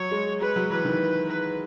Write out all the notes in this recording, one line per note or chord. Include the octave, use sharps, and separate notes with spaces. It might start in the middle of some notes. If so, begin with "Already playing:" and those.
Already playing: F#3 C#5
G#3
G#3 B4
F#3
E3 B4
D#3
B4